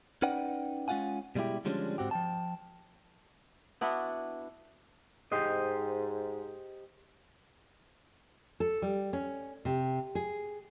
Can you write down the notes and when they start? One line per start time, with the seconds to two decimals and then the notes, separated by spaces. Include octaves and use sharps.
0.22 C#4 D#4 B4 D5 F#5 G5
0.88 G#3 C#4 F4 F5 F#5 G#5
1.35 B2 G3 G#3 E4 G4
1.65 D3 F3 G3 G#3 C#4 D4
1.98 G#2 C4 F#4 G4
2.11 F3 G5 A5
3.81 B3 D4 E4 F#4
5.32 G#2 G4 C5 D#5
8.60 A4
8.82 G3
9.13 C#4
9.65 C3
10.15 G#4